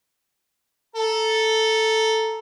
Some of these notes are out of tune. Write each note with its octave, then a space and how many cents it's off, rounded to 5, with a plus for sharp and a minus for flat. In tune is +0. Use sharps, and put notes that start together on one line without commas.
A4 +0 A#5 +0